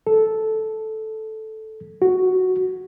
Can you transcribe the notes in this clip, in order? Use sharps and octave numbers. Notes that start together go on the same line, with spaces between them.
A4
F#4